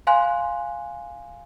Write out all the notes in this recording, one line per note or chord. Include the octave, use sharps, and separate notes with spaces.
F5 G#5 C6 F#6